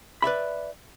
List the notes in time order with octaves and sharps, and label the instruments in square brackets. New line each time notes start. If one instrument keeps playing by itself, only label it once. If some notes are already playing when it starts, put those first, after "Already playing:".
[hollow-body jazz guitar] B4 D5 E5 B5